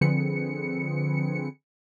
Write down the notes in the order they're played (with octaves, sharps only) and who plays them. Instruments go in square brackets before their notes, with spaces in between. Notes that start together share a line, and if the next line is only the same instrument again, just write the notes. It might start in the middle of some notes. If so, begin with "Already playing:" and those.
[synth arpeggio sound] D3 F3 C4 G#4 B4 C#7